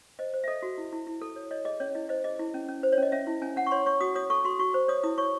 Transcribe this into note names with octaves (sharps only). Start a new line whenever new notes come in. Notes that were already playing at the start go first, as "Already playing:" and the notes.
C5 D#5
C5
E5
A4 D#5
F#4
E4
E4
E4
A4
C#5
C#5 D#5
G#4 D#5
C#4 C#5
E4 D#5
C5 D#5
G#4 D#5
E4
C#4
C#4
C5
C#5
C#4 D#5
C#4 E5
E4
C#4 G#5
C#4 F#5
C#6
C#5 C6
C#5 C#6
F#4 D#6
C#5 D#6
A4 C#6
F#4 C6
F#4 C#6
C5
C#5 D#6
E4 D#6
C#5 C#6